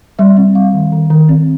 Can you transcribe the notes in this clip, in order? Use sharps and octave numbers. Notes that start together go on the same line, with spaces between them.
G3 E5
C4
G3 F5
D#3
D#3
D#3
C4